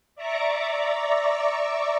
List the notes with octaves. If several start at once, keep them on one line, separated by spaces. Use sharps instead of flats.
D5 E5 A#5 C#6 D6